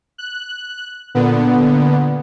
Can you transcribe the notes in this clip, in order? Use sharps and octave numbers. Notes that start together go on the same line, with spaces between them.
F#6
A#2 D3 B3